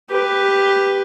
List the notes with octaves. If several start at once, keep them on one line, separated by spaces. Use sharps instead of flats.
G4 B4